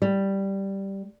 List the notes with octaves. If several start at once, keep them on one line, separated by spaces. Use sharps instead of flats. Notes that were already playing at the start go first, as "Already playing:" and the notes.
G3